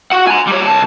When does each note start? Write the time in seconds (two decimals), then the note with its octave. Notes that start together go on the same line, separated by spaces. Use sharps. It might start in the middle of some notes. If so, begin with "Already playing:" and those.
0.12 F#4 F#5
0.27 G#5 A#5
0.47 G3 C#5
0.66 C2 A5